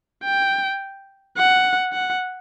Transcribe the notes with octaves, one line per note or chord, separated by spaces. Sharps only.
G5
F#5
F#5